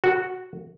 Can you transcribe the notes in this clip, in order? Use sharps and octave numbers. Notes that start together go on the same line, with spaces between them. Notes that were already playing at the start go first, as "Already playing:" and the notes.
F#4